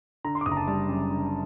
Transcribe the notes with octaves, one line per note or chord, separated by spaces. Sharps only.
D3 A#5
C6
D6
F#1 D#6
A#5
A5
G3 A5
F#2
D3